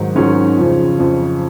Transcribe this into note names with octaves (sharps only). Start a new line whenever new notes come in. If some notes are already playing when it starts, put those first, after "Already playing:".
Already playing: G#2 D#3 F#3
G#2 D#3 F#3 C#4
F2 C#3 F3
F2 C#3 F3